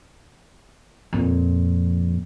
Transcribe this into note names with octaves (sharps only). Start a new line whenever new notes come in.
F2 A#2